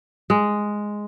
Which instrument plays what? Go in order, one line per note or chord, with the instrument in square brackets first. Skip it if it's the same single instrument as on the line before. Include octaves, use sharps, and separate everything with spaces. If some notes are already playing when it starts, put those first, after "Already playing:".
[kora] G#3